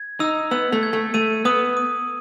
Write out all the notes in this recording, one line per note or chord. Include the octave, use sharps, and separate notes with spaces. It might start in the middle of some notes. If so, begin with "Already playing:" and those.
Already playing: G#6
D#4 E6
B3 E6
A3
G#6
A3
A3 D#7
B3 D#6
D#6